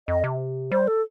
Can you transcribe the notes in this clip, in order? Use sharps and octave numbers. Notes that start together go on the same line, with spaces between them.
F2 D#5
C3
G3 C5
A4